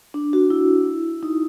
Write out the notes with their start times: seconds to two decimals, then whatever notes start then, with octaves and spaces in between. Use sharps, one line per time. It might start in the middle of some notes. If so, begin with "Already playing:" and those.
0.14 D4
0.33 F#4
0.50 E4
1.23 D#4